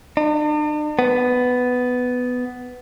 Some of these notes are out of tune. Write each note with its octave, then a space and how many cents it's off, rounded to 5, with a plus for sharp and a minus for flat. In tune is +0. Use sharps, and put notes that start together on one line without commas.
D4 +45
B3 +10